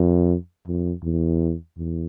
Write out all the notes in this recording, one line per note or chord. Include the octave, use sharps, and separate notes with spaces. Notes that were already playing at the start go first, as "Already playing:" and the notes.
Already playing: F2
F2
E2
E2